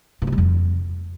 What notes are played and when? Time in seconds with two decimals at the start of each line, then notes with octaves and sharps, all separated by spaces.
0.22 A#2
0.27 C3
0.32 G3
0.38 F2